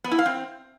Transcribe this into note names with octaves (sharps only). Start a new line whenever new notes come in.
B3
E4
F5
C4